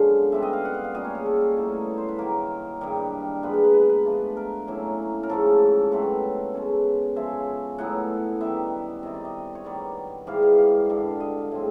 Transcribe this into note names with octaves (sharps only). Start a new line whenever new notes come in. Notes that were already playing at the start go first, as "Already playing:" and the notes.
Already playing: F#2 D3 F3 G#3 B3 F5
B2 G3 C4 E5
D#5
F5
F#5
F5
F5
A#2 G3 A#3 C#4 D#5
C#5
G#4
A4
A2 F#3 B3 D#4
C5
B4
D#3 F#3 A#3 A#4
G2 D#3 G3 A#4
A#2 F3 G#3 B3 B4
A#4
B4
B4
A#4
B4
F3 A3 D4 F4
A#4
A2 F#3 A#3 C#4
A#4
G#2 F3 A3 C#4 A4
B2 F#3 A3 C4 B4
B2 G#3 C#4
C#3 F3 G#3 C#4 E5
A2 F#3 B3 F#5
D#3 G3 B3 E5
C3 D#3 G3 D#5
D5
D#5
C#5
D#3 G3 B3 D5
G#2 E3 G3 F5
F5
F5
G2 D3 G3
D#5
A2 F3 G#3 C4